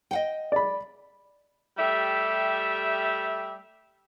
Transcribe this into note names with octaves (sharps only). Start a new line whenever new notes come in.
D#5 F#5 G5
D5 B5
G3 A3 G4 E5